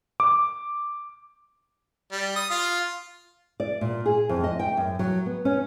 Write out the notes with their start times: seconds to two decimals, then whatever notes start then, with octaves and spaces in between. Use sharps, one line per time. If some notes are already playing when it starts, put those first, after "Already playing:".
0.20 D6
2.12 G3
2.36 D#6
2.50 F4
3.60 D5
3.81 A#2
4.06 G#4
4.29 F2
4.44 D#5
4.59 G5
4.77 F#2
4.99 F#3
5.26 B3
5.45 C#4